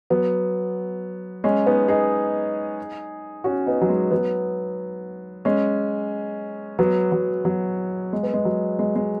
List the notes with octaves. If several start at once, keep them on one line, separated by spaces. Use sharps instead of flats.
F#3 B3
G#3 C#4
B3 D#4
D#4 G#4
C#4 F#4
B3 D#4
F#3
G#3
F#3 B3
G#3 C#4
F#3 B3
F#3
F#3
G#3
B3
G#3
F#3
G#3
G#3